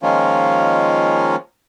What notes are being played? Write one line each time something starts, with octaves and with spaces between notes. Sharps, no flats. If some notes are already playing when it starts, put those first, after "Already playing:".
D#3 F3 G#3 A#3 C#4 F4